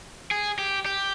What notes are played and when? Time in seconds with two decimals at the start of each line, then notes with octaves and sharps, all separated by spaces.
0.31 G#4
0.59 G4
0.86 G4